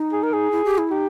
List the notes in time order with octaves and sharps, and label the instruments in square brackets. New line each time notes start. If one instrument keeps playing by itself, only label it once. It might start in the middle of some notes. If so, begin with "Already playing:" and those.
Already playing: [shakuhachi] D#4
[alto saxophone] G#4
A#4
G#4
[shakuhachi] E4
G4
E4
[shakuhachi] D#4 [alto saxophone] G4